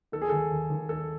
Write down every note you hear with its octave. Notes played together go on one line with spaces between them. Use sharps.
D#3 A4
G#4
D#2 A4
D#2
D#2
D#3 A4